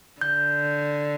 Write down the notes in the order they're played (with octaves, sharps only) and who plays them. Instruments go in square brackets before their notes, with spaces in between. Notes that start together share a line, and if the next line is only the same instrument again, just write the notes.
[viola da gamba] D3 [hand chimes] G6